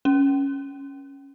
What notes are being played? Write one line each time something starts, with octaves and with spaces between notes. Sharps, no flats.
C#4